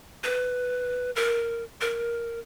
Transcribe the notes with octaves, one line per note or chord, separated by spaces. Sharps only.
B4
A#4
A#4